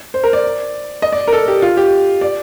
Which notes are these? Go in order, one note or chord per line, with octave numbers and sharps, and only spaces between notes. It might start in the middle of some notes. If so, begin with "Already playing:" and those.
C5
A#4
D5
D#5
D5
A#4
A4
G4
F4
G4
D5